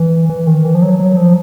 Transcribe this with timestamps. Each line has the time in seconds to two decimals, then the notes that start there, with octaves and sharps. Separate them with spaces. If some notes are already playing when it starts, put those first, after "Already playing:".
Already playing: E3
0.29 E3
0.47 D#3
0.65 E3
0.75 F3
0.82 F#3
0.99 F#3
1.17 F3